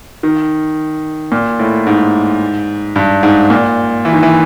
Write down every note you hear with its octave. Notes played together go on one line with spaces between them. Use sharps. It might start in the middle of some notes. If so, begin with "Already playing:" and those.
D#3
A#2
A2
G#2
G2
G#2
A#2
E3
D#3
E3